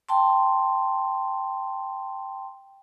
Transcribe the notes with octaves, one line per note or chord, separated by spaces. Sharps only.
G5 A5 C6